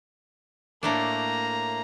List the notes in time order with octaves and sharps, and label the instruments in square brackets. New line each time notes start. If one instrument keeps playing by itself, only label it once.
[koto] A2 A3 D4 [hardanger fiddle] A#3 A#5